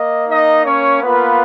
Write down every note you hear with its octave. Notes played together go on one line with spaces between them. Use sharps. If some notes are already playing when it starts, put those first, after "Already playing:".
Already playing: A#3 D#5
D#4 D#5
C#4 C#5
A#3 B3 F4 B4